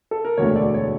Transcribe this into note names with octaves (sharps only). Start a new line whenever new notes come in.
A4
A#4
E1 D2 D3 A3 C#5
D5
C#5